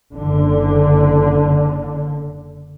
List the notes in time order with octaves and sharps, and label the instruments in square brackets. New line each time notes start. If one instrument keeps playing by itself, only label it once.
[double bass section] F#1 D3